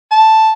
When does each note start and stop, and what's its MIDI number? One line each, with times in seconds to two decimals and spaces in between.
0.11 0.51 81